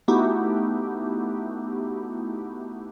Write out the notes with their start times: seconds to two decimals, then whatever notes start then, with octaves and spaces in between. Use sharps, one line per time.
0.08 A3 B3 D#4 E4 F#4 G4